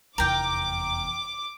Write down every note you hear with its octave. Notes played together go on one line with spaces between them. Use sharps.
F1 E2 A#4 G5 D6